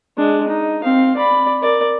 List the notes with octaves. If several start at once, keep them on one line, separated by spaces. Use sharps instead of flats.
G#3 D4
D#4
C4 F5
D5 B5
A#4 D5